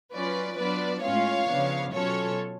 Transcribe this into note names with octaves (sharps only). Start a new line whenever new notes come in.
F#3 C#4 F4 B4 D5
F#3 B3 D4 F4 B4 D5
A2 G#3 C#4 F4 C#5 F5
C#3 F3 B3 D4
B2 F#3 C#4 F4 A4 C#5